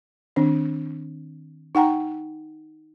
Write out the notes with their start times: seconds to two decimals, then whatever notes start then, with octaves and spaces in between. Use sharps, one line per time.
0.36 D#3 C4 D4
1.75 D#4 F#5 G5 A#5